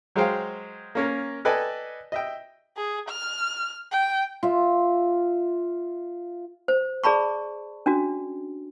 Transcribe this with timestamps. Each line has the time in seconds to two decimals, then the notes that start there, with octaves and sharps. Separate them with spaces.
0.16 F#3 G#3 G#4 C5 F5 G5
0.95 A#3 C#4 A#4
1.45 A4 B4 D5 D#5 G5 G#5
2.12 D#5 E5 G5
2.77 G#4
3.09 F6
3.92 G5
4.43 F4 E5
6.68 C5
7.04 G#4 D5 A5 B5 C#6
7.86 C#4 D4 F#4